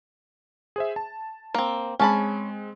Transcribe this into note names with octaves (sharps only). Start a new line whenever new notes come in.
G#4 C5 E5
A5
A#3 C4
G#3 C4 C#4 A5 B5